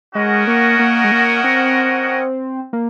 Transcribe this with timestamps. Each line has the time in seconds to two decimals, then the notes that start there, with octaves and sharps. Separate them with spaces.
0.15 G#3 C#4 F#4 A#4 D#5 F#5
0.47 A#3
0.79 A#3
1.04 G#3
1.12 A#3
1.44 C4
2.73 A#3